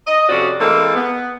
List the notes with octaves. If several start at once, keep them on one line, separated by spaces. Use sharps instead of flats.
D#5
F2 C3 C4 C#4 F#4 D5
E3 G#3 A#3 C4 A4
B3